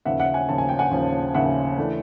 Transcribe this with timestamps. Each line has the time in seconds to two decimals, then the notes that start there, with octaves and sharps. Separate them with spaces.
0.05 D#2 C#3 F3 E5 F#5
0.20 E5 F#5
0.34 F#5 G#5
0.49 D#2 C#3 F3 A5
0.58 G#5
0.69 G5
0.79 F#5 G#5
0.91 D#2 C#3 F3
1.34 D#2 C#3 F3 E5 F#5
1.78 E3 A3 D4